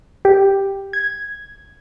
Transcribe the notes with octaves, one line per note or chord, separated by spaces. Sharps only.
G4
G#6